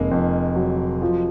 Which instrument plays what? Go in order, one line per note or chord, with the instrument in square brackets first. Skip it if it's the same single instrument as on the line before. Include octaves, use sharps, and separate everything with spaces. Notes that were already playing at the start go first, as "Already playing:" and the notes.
Already playing: [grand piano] F1 [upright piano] G#3 A#3
[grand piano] F2
F#3
F3